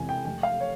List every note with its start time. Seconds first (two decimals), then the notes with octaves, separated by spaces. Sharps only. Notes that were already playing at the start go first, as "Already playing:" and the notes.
Already playing: E1 E2 C3 G#5
0.09 G5
0.25 F1 G5
0.43 F5
0.60 C#5